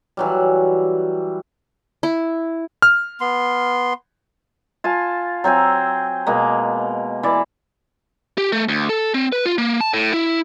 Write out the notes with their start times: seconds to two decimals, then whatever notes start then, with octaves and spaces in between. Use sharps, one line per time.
0.17 E3 F#3 G3
2.03 E4
2.82 F6
3.21 B3 C6
4.84 F4 G#5 A5
5.44 F#3 C4 C5 G#5
6.27 B2 G#3 A#3
7.23 E3 D5
8.38 G4
8.52 A3
8.69 D2
8.89 A4
9.14 C4
9.32 B4
9.46 F4
9.58 A#3
9.81 A5
9.94 A2
10.14 E4